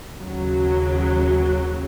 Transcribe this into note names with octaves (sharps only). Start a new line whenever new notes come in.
D#2 C#3 F#3